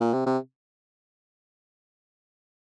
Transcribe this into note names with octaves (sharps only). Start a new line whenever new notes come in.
A#2
C3
C3